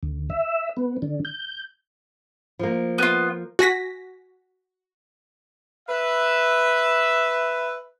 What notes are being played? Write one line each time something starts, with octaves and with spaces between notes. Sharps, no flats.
D2
E5
B3
D3
G6
F3 A#3
B3 F4
F#4 G#5 A#6 B6
B4 E5